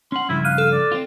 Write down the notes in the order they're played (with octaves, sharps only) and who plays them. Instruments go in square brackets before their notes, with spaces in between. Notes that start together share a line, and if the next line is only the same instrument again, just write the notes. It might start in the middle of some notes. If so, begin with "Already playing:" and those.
[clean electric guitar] C#4 F#5 [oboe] C6
[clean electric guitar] G2 C#3 F3 [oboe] E4
[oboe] F5 [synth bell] F6 F#6 D#7
[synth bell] A4
[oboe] D5
[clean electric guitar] C4 F4